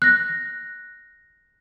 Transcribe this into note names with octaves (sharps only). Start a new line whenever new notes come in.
F#6 A#6